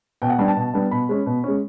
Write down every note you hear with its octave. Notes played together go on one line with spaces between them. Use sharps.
B2 G5
F#5
G3 B3 D4 G5
A5
B2
G3 B3 D4
B2 B5
G#3 C#4
B2
G#3 C#4